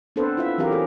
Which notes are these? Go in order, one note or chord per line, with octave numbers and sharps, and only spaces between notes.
B3 C4 D4 A4 B4 C5
E4 F4 E5
E3 F#3 C4 G4 A#4 F5
G#4 A4